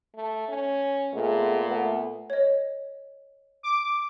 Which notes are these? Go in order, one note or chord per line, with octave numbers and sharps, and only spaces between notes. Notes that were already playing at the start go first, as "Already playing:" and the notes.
A3
C#4
A#2 G#3 A3 B3
A3 B3
C#5 D#5
D6